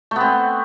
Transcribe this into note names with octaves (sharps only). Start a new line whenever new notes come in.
A3 B3 C4